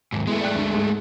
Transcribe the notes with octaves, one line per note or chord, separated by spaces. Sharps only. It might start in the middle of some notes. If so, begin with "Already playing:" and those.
D#2 G#2
G#3 A3 B3 E4
D5 G5 F#6
D2
G#2